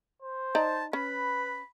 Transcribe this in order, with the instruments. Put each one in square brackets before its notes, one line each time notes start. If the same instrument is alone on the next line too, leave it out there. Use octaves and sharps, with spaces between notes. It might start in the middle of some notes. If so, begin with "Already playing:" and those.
[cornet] C5
[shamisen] D#4 D5 A#5 [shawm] A5
[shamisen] C#4 [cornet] B4 [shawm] B5